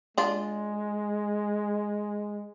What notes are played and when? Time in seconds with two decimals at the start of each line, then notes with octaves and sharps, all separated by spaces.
0.18 G#3 D4 F4